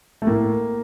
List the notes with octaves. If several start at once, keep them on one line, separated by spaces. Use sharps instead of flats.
A3
A2 A#3